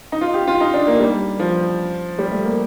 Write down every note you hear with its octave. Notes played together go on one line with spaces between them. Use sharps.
D#4
F4
G4
F4
D#4
D4
A#3
G3
F3
G3
A3
A#3